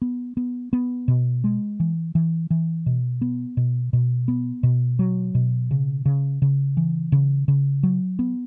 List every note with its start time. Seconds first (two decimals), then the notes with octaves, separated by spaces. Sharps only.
0.02 B3
0.37 B3
0.73 B3
1.08 B2
1.44 G#3
1.80 E3
2.15 E3
2.50 E3
2.86 B2
3.21 B3
3.57 B2
3.93 B2
4.28 B3
4.63 B2
4.99 F#3
5.35 B2
5.71 C#3
6.06 C#3
6.42 C#3
6.77 E3
7.12 C#3
7.48 C#3
7.83 F#3
8.19 B3